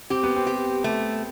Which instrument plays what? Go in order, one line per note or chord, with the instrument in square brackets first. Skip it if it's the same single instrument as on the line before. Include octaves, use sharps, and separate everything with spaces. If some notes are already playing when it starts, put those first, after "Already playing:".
[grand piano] C4 [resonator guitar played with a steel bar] G4
[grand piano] B3
C4
[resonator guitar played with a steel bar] G4
A3